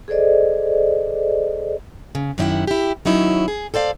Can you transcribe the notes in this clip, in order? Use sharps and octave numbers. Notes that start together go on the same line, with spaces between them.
G#4 A4 C5 D5 D#5
C#3
F#2 D#3 C#4 E4 G4 F#5
E4 G4
D#3 F#3 C#4 D#4 E4
G#4
A4 C5 D5 F5